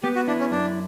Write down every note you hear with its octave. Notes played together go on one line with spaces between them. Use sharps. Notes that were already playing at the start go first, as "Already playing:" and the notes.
B3 G4
F#4
D4 E4
C#4
F#2 D4